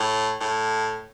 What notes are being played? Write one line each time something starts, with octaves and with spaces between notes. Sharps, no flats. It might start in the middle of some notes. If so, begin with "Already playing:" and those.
Already playing: A2
A2